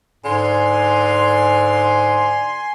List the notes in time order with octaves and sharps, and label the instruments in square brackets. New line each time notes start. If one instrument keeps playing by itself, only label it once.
[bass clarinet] G#2 [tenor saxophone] D3 [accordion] G#5 C6